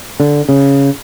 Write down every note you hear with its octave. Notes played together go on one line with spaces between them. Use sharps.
D3
C#3